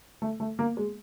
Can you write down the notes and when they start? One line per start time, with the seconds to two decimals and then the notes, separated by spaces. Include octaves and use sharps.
0.22 A3
0.40 A3
0.59 A#3
0.77 G#3